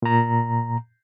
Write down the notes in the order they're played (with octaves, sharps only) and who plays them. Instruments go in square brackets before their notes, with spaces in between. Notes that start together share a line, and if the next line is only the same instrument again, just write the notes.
[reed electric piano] A#2 A#5